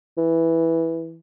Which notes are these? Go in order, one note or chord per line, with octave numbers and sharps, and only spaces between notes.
E3